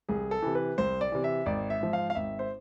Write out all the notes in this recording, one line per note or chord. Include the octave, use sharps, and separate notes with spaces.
C2 G#4
A4
C3 E3
B4
C2 C5
D5
C3 E3
E5
G#1 D5
E5
G#2 F3
F5
F5
G#1 E5
C5